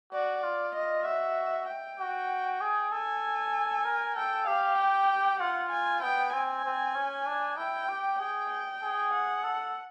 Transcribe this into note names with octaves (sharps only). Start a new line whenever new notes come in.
F#4 D5
F4
D#5
F#4 E5
G5
F#4
G#4
A4 G#5
A#4
A4 G5
G4 F5
G5
F4 F#5
G#5
B3 G5
C4 G#5
C4
C#4
D4
E4 G5
G4
G#4 G5
G5
G#4
F#5
A4